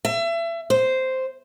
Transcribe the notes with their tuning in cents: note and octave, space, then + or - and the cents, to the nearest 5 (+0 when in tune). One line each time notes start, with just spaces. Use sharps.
E5 +30
C5 -5